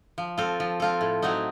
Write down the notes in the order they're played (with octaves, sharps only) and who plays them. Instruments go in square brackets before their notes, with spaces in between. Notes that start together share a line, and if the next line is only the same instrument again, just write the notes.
[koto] F3
C4 F4 A4
F3
C4 F4 A4
A2
F#3 A3 C4 D#4